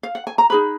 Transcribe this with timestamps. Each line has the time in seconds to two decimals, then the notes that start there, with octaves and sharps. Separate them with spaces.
0.03 F5
0.15 F#5
0.27 G#5
0.38 A#5
0.50 D#4 G#4 B4 B5